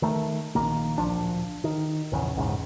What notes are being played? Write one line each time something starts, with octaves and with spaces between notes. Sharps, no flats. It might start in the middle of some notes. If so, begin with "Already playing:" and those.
D#3 A3
A#1 D#3 A#3
D1 A#1 F3 D4
D#3
A#1 E2 C#3
A#1 E2 G#2 C#3